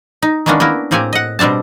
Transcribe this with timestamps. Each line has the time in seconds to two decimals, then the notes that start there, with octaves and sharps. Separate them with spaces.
0.22 D#4
0.46 D#3 G#3 A#3 B3 C#4 D4
0.60 A#3 B3 E4 A#4
0.91 A2 A#3 C4 G4 G#5
1.13 D#5 F#5
1.39 B2 G3 C4 D4 A5